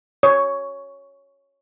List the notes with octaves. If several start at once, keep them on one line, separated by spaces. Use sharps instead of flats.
C#5